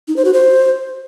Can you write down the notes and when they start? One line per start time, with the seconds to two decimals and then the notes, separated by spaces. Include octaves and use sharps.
0.08 D#4
0.16 C5
0.25 F#4
0.33 C5